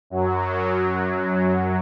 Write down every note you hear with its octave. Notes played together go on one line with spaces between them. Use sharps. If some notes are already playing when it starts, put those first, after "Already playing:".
F#2 F#3